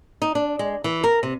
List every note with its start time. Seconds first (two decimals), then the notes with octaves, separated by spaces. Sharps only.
0.22 D#4
0.35 D4
0.59 G#3
0.84 E3
1.04 A#4
1.23 C3